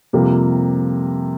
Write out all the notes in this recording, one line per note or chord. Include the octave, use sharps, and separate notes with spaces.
F2 C3 G3 A#3